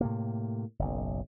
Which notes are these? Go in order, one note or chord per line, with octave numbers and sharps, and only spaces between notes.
A2 C3 A#3
F#1 B1